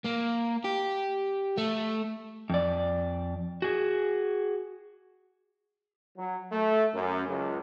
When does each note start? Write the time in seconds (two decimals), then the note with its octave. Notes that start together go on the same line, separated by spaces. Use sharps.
0.05 A#3
0.65 G4
1.58 A3
2.50 F2 D5
3.62 F#4 G#4
6.18 F#3
6.52 A3
6.95 F#2
7.29 C#2